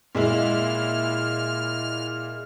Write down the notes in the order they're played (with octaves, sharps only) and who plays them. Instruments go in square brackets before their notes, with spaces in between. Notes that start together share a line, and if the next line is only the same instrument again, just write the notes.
[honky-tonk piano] A#2 G#3 E4 [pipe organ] F6